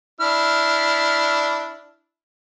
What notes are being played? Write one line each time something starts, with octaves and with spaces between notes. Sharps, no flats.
D4 E4 F6